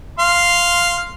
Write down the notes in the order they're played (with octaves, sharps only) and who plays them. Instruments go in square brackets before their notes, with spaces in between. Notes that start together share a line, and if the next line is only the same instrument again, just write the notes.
[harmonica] F5 C6